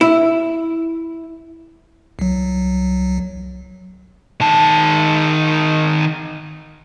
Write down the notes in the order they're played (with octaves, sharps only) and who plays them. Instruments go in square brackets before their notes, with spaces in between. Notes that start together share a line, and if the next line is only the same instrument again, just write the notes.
[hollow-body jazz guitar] E4
[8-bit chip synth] C2 F#3
[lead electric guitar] D#3 A5